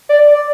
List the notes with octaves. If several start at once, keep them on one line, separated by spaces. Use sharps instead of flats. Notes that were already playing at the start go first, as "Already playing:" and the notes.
D5
D5